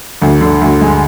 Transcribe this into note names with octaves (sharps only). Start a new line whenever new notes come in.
D2
D3
D2
G#3